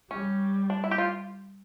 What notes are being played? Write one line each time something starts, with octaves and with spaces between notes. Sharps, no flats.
G3 C#4
D4
E4
G4
F4